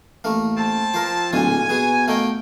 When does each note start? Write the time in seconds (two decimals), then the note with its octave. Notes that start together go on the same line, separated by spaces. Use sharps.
0.24 A1 A3 A#3
0.58 C4 A5
0.94 F3 A#4 C5
1.33 D1 B1 A#2 F4 G#5
1.69 B2 B3 G#4
2.08 A3 A#3 D#4 E4 G5